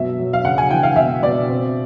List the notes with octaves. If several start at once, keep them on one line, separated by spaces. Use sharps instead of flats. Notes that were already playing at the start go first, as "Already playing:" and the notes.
Already playing: B2 F#3 E5
F#3
F5
C#3 F#5
G#5
E3 G5
F5
B2 E5
B2 D5
C4